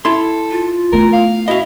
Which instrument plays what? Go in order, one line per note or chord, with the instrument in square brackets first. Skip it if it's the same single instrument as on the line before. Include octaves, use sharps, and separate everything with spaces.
[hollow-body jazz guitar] E4 C6 [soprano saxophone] A4
[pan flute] F4
[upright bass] A3 B3 [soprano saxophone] A#4
[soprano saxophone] F5
[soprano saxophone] E4 [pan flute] F#4 [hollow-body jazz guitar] D#5 F5